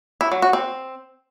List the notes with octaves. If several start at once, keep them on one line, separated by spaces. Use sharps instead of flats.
E4
F#3
F#4
C4